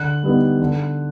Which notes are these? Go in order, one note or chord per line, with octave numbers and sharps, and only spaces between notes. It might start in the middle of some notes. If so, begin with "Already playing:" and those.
Already playing: D3 F#6
G3 B3 D#4
D3